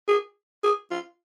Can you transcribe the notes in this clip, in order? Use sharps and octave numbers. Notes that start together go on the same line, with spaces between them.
G#4
G#4
F4